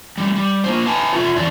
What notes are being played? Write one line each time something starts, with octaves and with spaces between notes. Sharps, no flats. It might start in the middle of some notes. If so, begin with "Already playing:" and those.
G3 A3
G3
A#3 F4 C5
B4 F5 G#5 A5
F4 A4 E5
E2 D3 F#3 D4